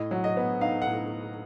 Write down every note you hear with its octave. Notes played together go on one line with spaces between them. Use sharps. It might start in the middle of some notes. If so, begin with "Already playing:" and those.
Already playing: A2 D#5
F#3
D#5
B3
D#4 F5
F#5
A2